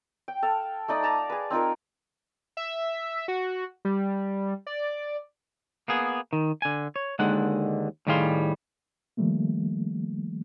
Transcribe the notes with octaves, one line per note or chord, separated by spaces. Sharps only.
G5
A4 F5
A3 D#4 D5 D#6
F5 A5 A#5 D6
G#4 B4
C4 D#4 F4 A#4
E5
F#4
G3
D5
A#3 B3 G#4
D#3
D3 G#5
C#5
D#2 D3 D#3 G#3 F#5
A2 D#3 G3 G#4 F5 C6
D#3 F3 G3 A3 A#3